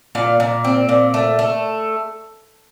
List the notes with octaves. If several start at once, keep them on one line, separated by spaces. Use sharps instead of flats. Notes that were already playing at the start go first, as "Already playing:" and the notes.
A#2 F5
A#2
C4
A#2
A3
A3